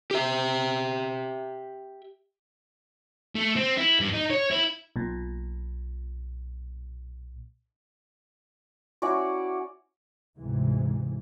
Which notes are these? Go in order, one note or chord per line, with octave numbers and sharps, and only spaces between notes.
G4 E5
A3
C4
E4
G2
D#4
C#5
E4
B1 A#2
C#4 E4 F#4 D5
D2 G#2 C3 E3 G#3